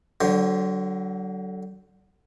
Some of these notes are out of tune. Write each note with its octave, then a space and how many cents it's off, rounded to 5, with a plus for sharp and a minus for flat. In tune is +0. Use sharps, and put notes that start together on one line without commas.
D3 +0 F#3 +35 C5 +0